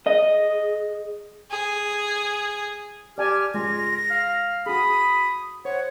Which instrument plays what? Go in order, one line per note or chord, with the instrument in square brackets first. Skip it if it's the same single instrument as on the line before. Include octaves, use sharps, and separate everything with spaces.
[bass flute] G#4 [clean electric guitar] D#5
[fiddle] G#4
[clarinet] G4 [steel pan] D5 G#5 A5 [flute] F6
[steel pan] G#3 G#5 [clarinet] F4 [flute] A#6
[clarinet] F5
[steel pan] F#4 G#4 [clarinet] B5 [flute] D#6
[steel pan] C5 [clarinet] C#5 [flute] F#5